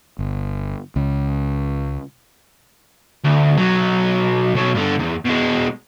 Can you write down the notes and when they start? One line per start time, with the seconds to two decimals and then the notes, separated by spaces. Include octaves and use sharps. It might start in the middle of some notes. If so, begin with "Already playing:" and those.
0.19 G1
0.96 C#2
3.24 D2
3.57 B1 F#3
4.55 B1 F#3
4.75 G2 D3
5.00 E2
5.25 B2 G#3